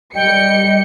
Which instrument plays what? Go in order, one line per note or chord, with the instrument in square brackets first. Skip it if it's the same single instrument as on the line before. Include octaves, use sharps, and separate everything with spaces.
[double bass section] G3 [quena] D#5 [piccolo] G5 [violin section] C#7